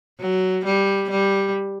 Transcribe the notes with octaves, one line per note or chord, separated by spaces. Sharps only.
F#3
G3
G3